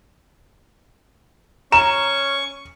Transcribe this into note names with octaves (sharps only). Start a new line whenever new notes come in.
C#4 A#5 C#6 E7